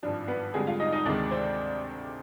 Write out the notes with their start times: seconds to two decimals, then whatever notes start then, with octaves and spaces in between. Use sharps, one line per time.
0.03 G#1 G2 F3 D4
0.28 B3 B4
0.54 F2 D3 G3 G#3 G#4
0.67 F4 F5
0.80 D#4 D#5
0.92 D#4 D#5
1.05 D2 C3 D#3 G#3 D4 D5
1.31 C4 C5